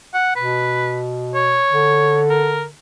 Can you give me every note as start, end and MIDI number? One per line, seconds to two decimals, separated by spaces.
0.14 0.36 78
0.36 1.64 47
0.36 1.03 71
1.35 2.20 73
1.72 2.73 50
2.29 2.64 70